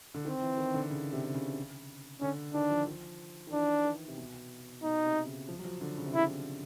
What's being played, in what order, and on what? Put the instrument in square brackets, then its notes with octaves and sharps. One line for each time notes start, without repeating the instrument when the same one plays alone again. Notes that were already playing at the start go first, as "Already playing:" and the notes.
[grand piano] D3
[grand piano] D#3 [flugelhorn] C4
[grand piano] E3
D#3
D3
C#3
C3
C3
C#3
[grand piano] D3 [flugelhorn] C#4
[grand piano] D#3 [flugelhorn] D4
[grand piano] F3
F3
D#3
[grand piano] E3 [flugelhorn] D4
[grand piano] D#3
C3
B2
[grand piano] B2 [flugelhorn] D#4
[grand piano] C3
C#3
F3
F#3
F3
D3
C#3
C3
[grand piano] C#3 [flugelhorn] E4